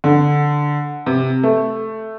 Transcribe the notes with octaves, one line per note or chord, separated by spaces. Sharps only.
D3
C3
A3